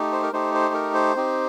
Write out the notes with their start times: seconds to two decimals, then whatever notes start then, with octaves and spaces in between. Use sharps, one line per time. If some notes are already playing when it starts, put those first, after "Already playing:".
Already playing: A3 D#4 G4
0.12 C5
0.22 A#4
0.33 A3 D#4 G4 C5
0.54 C5
0.74 A#4
0.94 C5
1.16 C4 D#4 G4